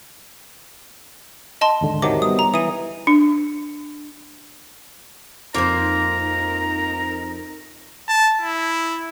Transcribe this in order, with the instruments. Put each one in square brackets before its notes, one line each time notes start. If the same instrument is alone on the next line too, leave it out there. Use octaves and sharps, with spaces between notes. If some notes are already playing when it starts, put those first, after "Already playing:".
[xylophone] D#5 A5 C6
[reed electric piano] D#2 G#2 D3
[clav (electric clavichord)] C3 D#3 F#3 [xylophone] D6
[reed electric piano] G3 B3 [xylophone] D#6
[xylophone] A#5
[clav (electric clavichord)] E3 [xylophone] D#6 D#7
[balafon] D4
[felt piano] F2 [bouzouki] A#3 C5 [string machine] D#4 A#4 [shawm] A#5
[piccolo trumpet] A5
E4